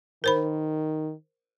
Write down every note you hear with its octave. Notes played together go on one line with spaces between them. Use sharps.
D#3 A#4 C5 B5